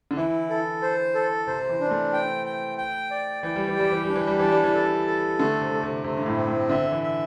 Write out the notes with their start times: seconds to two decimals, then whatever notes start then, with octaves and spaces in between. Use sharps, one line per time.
0.11 D3
0.17 E3 E4
0.50 A4
0.82 C5
1.15 A4
1.47 C3 C5
1.69 E3
1.81 D4
1.86 C4
1.91 A3
2.13 G5
2.46 G5
2.78 G5
3.11 D5
3.43 E3 G5
3.56 G3
3.67 E3
3.76 G3 G4
3.92 E3
4.03 G3
4.09 D4
4.16 E3
4.27 G3
4.39 E3 A5
4.52 G3
4.64 E3
4.74 A4
5.06 A4
5.39 D3 A3
5.61 C3
5.72 A3
5.83 C3
6.04 C3 A3
6.17 G2
6.26 A2
6.37 C4
6.48 A2
6.69 D3 E5
6.91 E3
7.03 E5